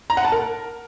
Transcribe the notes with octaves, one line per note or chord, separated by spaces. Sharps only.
A#5
F#5
A5
A#4